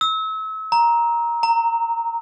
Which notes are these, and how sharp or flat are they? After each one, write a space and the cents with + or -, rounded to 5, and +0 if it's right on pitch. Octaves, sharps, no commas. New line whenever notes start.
E6 -35
A#5 +10
A#5 -15